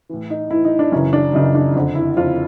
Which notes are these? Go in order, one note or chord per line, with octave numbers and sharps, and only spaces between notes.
A2 E3
D#4
A2 E3 E4
D#4
D4
F#2 C#3 E3 C#4
D4
F#2 C#3 E3 D#4
D4
F2 D3
E4
F2 D3 F4